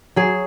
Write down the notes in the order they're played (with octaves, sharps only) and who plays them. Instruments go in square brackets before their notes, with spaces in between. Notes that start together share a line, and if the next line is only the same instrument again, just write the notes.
[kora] F#3 G#4